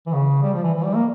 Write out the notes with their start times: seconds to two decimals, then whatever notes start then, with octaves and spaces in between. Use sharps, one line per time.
0.07 E3
0.13 C#3
0.42 G3
0.54 F3
0.63 E3
0.74 E3
0.84 G3
0.95 A#3